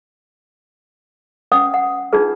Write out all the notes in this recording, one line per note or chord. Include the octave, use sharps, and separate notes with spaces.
C#4 B4 F#5 G5 D#6
F#5
D4 D#4 F4 G#4 B4